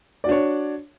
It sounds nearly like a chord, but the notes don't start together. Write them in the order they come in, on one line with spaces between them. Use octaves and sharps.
D5 F#4 D4 C#5